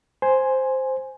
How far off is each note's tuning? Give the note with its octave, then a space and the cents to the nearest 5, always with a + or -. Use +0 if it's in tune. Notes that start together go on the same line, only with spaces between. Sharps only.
C5 +0 G#5 +0